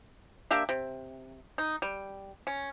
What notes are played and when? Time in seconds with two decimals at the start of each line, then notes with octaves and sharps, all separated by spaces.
0.51 A#3 D4 G4 E5
0.69 C3
1.58 D#4
1.82 G3
2.47 C#4